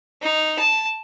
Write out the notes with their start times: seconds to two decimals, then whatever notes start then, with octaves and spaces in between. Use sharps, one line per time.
0.23 D#4
0.59 A5